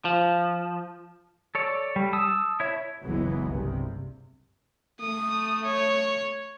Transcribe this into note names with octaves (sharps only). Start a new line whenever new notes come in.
F3
A4 C#5 D5
G3
A5 D#6 E6
E4 C#5 E5
F#1 C#2 E3 F#3 G#3 B3
C2 G2 C3
A3 D#6
C#5